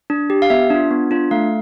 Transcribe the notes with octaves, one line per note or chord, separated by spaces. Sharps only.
D4
G4
F5
B3 E5
D4 F4
B3
D4 F4
A3 F5